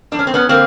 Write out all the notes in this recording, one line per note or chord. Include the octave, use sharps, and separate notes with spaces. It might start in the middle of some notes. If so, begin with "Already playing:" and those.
F2 D4
C#4
C4
B3 C#4
D3 A#3 C4